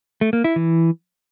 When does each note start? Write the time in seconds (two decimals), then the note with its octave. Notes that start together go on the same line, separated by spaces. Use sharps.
0.21 A3
0.33 A#3
0.44 E4
0.56 E3